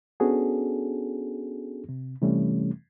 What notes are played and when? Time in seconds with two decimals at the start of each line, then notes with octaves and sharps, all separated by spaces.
0.20 B3 C#4 D4 F#4 G#4 A4
1.89 C3
2.21 C3 E3 G3 A3 C#4